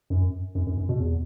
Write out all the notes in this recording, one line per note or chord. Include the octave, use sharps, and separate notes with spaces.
F#2
F#2
F#2
F#2
B2
E2